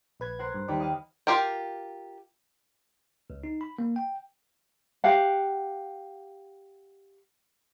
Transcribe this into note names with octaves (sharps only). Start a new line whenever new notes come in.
A#1 B4 G#6
A#4 C5 F#5
G2
D#2 G3 D#4 G4 B4 D5
D#5 F5
F4 G4 A#4 G5
C#2
D#4
B5
A#3
G5
G4 F5 F#5